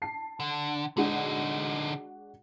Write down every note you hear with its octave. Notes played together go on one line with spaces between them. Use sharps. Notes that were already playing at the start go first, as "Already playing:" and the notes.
A5 C7
D3
D3 G#3 D4 D#4 F#4